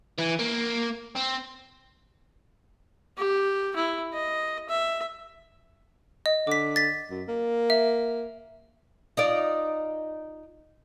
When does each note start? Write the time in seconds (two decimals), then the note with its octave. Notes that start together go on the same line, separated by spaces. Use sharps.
0.18 E3
0.39 A#3
1.16 C4
3.17 G4
3.76 E4
4.13 D#5
4.69 E5
6.26 D#5
6.47 D3 D6 B6
6.76 A6 B6
7.10 F#2
7.28 A#3
7.70 E5
9.17 D#4 F4 D5